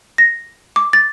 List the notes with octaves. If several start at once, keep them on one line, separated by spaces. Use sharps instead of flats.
A#6
D6
A6